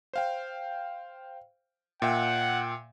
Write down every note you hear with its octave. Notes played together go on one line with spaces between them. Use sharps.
C5 F5 G5
A#2 E5 F#5 G5